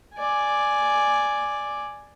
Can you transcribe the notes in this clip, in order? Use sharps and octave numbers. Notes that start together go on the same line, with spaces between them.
D5 G#5